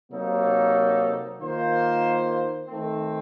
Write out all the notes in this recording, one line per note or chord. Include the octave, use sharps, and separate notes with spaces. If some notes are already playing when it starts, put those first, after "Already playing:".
C3 F#3 A#3 D#4 A4
D#3 A#3 F4 C5
D#3 A3 C4